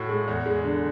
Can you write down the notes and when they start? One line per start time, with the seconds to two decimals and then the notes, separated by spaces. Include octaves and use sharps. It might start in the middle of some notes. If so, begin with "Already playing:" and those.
Already playing: A2 F#4
0.09 G#3
0.28 E2
0.46 G#3
0.64 D3